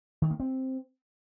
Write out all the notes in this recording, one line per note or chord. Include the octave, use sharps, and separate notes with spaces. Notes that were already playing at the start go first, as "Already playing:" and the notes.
D#3
A#3
C4